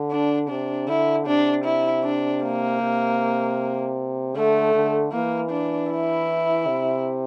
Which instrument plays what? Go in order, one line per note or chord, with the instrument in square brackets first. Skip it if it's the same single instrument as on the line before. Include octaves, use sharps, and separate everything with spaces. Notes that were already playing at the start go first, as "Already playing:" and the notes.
Already playing: [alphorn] D3
[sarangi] D4
[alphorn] C3 [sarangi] D4
[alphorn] D3 [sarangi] E4
[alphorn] C3 [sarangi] D4
[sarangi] E4
D4
A#3
[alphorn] C3
[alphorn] D3 [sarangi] A3
[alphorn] D3
[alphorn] E3 [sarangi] A#3
[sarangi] D4
E4
[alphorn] C3